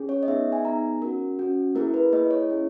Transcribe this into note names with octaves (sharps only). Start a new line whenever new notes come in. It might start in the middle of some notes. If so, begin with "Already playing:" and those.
Already playing: C#4 G#4
C#5
D#5
B3 D#4 G#4 E5
G#5
B3 D#4 G#4 A#5
C#4 F#4 A#4
C#4 F#4
A#3 E4 G#4 A#4
B4
A#3 E4 G#4 D#5
C#5
C#4 E4 G#4